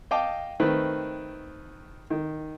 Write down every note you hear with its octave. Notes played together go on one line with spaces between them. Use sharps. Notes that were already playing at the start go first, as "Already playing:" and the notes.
D#5 F5 G5 A5 D6
D#3 A3 C4 B4
D#3